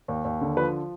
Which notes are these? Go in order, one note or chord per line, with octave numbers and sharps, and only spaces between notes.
D#2
D#2
D3
F3 B4